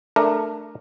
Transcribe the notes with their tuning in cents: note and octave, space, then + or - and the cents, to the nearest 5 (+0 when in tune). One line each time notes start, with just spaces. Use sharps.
A3 +0 D4 +15 A#4 +0